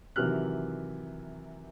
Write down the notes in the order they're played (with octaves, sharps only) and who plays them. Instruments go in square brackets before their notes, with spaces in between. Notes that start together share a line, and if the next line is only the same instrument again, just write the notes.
[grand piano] C3 D#3 E3 F#3 F6 F#6